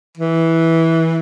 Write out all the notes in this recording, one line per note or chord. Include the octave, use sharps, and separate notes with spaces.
E3